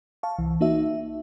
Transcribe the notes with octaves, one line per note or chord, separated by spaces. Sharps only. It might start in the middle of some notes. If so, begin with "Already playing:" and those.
F5 A5 C#6
C2 E3
A#3 D#4 F#4 E5